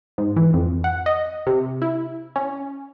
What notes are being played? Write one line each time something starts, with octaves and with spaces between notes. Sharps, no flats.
G#2
E3
F2
F#5
D#5
C3
E4
C#4